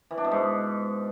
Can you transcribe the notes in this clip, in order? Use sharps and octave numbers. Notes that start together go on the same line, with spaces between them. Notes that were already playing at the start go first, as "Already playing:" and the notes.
E3
D4
B2
G#2